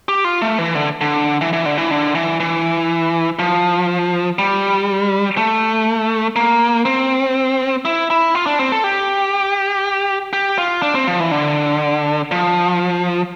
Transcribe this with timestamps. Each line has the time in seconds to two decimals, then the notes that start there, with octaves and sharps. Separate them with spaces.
0.09 G4
0.24 F4
0.42 A3
0.59 E3
0.75 D3
1.01 D3
1.41 E3
1.53 E3
1.66 D3
1.77 E3
1.91 D3
2.15 E3
2.40 E3
3.39 F3
4.39 G3
5.37 A3
6.36 A#3
6.85 C4
7.85 E4
8.10 E4
8.35 F4
8.46 D4
8.59 C4
8.72 A4
8.84 G4
10.33 G4
10.58 F4
10.82 D4
10.95 C4
11.07 F3
11.20 E3
11.31 D3
12.31 F3